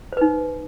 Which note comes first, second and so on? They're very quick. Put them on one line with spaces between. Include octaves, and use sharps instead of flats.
C5 B4 D#4